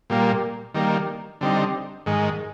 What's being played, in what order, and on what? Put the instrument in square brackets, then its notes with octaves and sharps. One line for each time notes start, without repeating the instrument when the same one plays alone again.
[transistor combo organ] A#2 G3 A#3
D#3 G3 A#3
D3 G3 C4 D#4
G#2 D#3 G#3